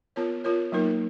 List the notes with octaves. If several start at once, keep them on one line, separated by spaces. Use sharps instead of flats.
B3 F4 A#4 C#5
B3 F4 A#4 C#5
F#3 A#3 D#4 A#4